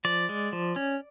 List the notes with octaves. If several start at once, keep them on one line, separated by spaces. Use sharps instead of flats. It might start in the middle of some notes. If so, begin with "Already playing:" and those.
F3 D5
G#3
F3
C#4